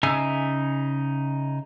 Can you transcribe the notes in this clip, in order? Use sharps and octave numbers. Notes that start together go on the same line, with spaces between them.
C#3 D#4 E5 G#5 E6